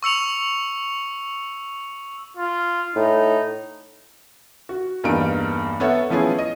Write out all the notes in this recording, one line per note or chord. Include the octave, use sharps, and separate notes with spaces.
C#6 E6 C#7 F7
F4
A2 D#4
F#4
E2 G2 A#3 D#4 F6 D7
B3 A4 C#5 E5 F#5
A2 F3 B3 C#4 E4 G#4
D#5